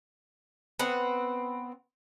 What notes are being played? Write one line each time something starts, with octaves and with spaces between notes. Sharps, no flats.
B3 C4 F#5